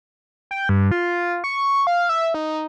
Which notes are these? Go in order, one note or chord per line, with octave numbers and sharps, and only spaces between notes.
G5
G2
F4
C#6
F5
E5
D#4